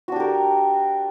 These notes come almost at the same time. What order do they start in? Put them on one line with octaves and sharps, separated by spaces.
F#4 D4 G4 A#4